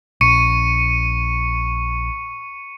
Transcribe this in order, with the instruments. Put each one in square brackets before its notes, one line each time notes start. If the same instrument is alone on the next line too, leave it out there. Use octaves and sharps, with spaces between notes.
[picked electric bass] A#1 [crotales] C#6 C#7 D#7